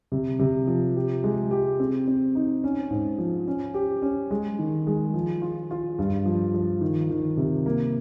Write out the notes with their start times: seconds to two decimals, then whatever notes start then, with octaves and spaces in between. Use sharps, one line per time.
0.12 C3
0.39 C3
0.67 F3
0.96 G4
1.24 G#3
1.51 G4
1.80 C4
2.07 C4
2.35 D#4
2.64 C#4
2.91 G#2
3.18 F3
3.48 C#4
3.74 G4
4.02 C#4
4.30 G#3
4.59 D#3
4.87 G#3
5.14 F3
5.42 F4
5.71 F4
5.99 G2
6.26 F3
6.54 F3
6.81 D#3
7.10 D#3
7.37 C3
7.66 A#3